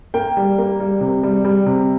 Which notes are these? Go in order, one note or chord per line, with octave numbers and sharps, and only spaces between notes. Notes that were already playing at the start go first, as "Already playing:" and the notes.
A#3 G5
G3
A#3
G3
C3
G3
G3
C3